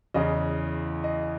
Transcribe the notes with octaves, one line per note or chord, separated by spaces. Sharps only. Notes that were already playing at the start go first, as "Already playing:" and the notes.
E2 C#3 E3 D#5
D#5